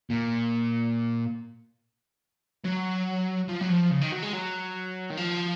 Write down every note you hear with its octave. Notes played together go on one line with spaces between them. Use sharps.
A#2
F#3
F3
F#3
F3
C#3
D#3
F#3
G#3
F#3
D#3
F3